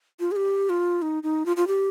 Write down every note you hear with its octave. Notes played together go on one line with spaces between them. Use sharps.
F4
G#4
G4
F4
D#4
D#4
F4
F4
G4